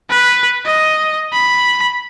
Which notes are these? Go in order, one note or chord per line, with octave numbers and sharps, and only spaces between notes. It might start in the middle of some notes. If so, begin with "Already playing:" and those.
B4
D#5
B5